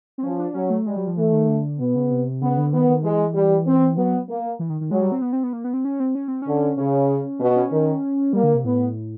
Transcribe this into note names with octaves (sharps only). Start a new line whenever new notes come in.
C4
F3 C#4
D4
F#3 C#4
A3
G3 G#3
F#3
F3
E3 A3
D#3
D3
B2 B3
C#3
C3
C#3 B3
D3
D#3 B3
D#3
E3 G#3
G3
C4
F#3 B3
A#3
E3
D#3
D#3
F#3 G#3
G3
C4
B3
C4
B3
A#3
B3
C4
C#4
C4
C#4
C4
D3 C#4
C#3 C#4
B2
C#4
D#3
G3 A#3
D3
C3
A2 B3